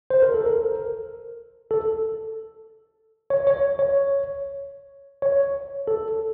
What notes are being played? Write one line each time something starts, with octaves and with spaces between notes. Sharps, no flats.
C5
A#4
A4
A#4
A4
C#5
C#5
C#5
C#5
A4